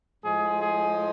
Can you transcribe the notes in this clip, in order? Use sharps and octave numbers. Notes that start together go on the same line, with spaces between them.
A2 F3 G#3 G#4
G#4